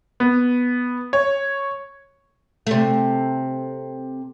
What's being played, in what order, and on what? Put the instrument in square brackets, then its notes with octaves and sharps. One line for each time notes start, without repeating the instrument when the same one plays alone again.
[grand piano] B3
C#5
[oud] C3 A3